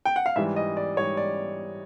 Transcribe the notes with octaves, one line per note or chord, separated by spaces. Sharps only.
G5
F#5
F5
G#2 E3 G3 E5
D#5
D5
G#2 E3 G3 C#5
D5